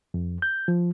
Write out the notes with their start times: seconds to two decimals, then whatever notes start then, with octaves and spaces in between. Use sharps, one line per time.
0.14 F2
0.42 G6
0.68 F3